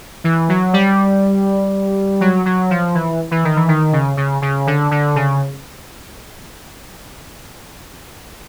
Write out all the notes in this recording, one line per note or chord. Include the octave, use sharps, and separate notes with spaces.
E3
F#3
G3
F#3
F#3
F3
E3
E3
D#3
E3
D#3
C#3
C#3
C#3
D3
D3
C#3